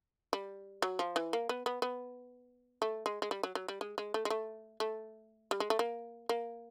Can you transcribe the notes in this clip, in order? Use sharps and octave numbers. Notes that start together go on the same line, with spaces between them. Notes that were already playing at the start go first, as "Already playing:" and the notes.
G3
F#3
F3
E3
A#3
B3
B3
B3
A3
G#3
G#3
G3
F#3
F#3
G3
G#3
G#3
A3
G#3
A3
A3
G3
G#3
A3
A#3
A#3